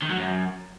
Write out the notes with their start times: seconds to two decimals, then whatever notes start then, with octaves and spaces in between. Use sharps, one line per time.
0.02 D#3
0.10 F#3
0.18 F#2